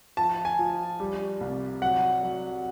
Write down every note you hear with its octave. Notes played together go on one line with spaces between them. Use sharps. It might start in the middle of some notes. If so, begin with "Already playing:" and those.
F3 A5
G#5
F3
G3
C2
F#3 F#5
F#3